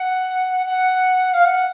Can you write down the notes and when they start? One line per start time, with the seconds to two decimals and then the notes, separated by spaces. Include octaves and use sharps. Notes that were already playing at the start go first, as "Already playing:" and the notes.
Already playing: F#5
0.66 F#5
1.33 F5
1.45 F#5